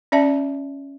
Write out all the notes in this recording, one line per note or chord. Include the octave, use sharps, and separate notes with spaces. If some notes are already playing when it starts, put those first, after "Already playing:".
C#4 D5 E5 A5